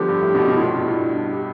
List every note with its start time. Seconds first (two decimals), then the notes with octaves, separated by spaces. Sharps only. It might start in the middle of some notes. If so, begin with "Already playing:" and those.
Already playing: D3 F3 G3 B3 G4
0.08 G2
0.22 A2
0.34 G2 B2
0.48 G2 B2
0.57 E4
0.61 A2 F4
0.75 G2 B2
0.87 G2 E4
1.15 D4
1.31 G4